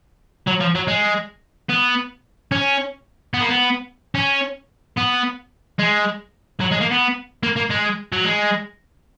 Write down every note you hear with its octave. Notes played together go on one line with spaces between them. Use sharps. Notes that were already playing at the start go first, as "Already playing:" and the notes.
F#3
F3
F#3
G#3
B3
C#4
B3
A#3
B3
C#4
B3
G#3
F#3
G#3
A#3
B3
A#3
A#3
G#3
F#3
G#3